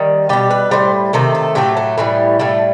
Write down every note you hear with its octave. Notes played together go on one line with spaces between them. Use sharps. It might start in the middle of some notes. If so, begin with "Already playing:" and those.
Already playing: D#3 G3
B2 G3 G4
B4
A2 G3 C5
C3 D#3 A3 A4
A4
A2 F#3 A3 G4
A3
A2 E3 G3 B3
A2 G3 A3